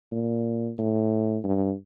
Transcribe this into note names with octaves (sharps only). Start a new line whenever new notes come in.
A#2
A2
G2